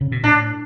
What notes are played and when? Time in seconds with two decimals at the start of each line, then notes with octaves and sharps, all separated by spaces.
0.01 C#3
0.12 B2
0.23 A2 D4